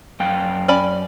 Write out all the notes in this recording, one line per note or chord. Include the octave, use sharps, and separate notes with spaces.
F#2 F5 G5
C#4 D5 B5